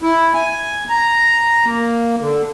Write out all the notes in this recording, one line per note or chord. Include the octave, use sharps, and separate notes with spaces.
E4
G#5
A#5
A#3
D3